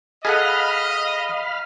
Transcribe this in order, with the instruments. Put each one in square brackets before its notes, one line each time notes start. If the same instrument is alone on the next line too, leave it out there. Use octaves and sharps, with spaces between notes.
[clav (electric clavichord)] G#4 A4 F#5 [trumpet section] D#5 [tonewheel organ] F5 B5 F6